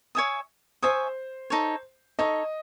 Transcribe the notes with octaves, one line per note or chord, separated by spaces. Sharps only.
C#5 E5 G#5 D#6
C5 C#5 E5 G#5 D#6
D#4 A4 C#5
D#4 A4 C#5 D#5